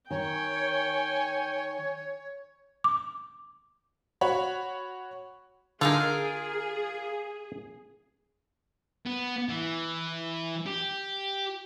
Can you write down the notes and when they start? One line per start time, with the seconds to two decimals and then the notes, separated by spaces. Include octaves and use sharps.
0.11 D#3 C#5 G5 G#5
2.84 D6
4.21 F#4 C#5 B5
5.81 D3 D#4 F4 G#4 A#4 G#5
9.06 B3
9.48 E3
10.66 G4